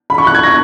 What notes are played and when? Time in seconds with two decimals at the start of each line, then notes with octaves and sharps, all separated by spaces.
0.10 B5
0.18 C#6
0.27 F#6
0.35 G#6
0.43 A#6